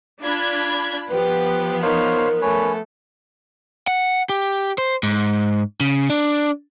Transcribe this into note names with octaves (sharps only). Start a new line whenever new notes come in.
D4 F4 B5 G#6
F3 B3 G4 B4
D#4 A#4 C5 C#5 F5
A3 C#4 B4 C#5
F#5
G4
C5
G#2
C#3
D4